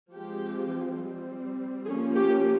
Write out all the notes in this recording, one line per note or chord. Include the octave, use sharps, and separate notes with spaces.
F3 G#3 C4 G4
G3 C4
F3 A#3 C#4 G#4
G4